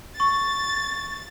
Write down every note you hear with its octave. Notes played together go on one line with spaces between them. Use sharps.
C#6 A6